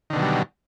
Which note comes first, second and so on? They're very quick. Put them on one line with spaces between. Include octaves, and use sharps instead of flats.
D#3 D3 B2 F#3 G3